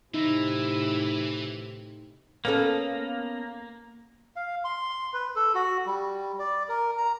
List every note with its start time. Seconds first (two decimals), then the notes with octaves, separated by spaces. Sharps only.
0.14 A2 C3 E3 D#4 E4 A#6
2.45 A#3 B3 C#4 A4
4.36 F5
4.65 C6
5.14 B4
5.36 A4
5.55 F#4
5.86 G3
6.39 D5
6.69 A#4
6.98 A#5